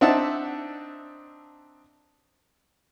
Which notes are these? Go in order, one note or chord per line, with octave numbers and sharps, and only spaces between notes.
C4 D4 D#4 E5 F#5 A5